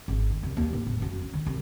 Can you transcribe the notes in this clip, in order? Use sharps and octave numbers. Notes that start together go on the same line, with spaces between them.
G#1
D#3
C2
D#2
A2
E1
F#2
C#4
D#3
C2